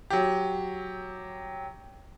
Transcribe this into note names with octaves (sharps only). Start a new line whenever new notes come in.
F#3 G4